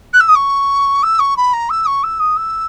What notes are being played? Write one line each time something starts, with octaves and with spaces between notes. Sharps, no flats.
F#6
E6
D#6
C#6
E6
C#6
B5
A#5
E6
C#6
E6
D#6
E6